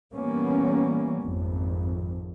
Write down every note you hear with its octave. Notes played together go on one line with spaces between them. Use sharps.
E3 G3 A#3 B3 C#4
G#1 F2